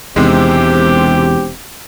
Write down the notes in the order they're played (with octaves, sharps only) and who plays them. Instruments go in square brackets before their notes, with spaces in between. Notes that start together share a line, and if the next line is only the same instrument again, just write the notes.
[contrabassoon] E1 [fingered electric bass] E2 [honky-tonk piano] C3 D#3 G#3 [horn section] C4 G4